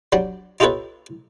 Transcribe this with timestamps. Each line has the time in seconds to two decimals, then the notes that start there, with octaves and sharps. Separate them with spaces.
0.12 F#3 G3 D4
0.60 D#4 F4 G4 A4 B4 C#5